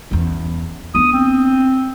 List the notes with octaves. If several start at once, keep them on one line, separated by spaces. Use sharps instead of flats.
E2 C#4
B3 D4 D#6
C4